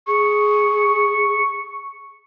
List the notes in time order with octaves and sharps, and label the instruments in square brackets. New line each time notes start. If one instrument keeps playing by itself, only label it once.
[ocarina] G#4 [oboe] C#6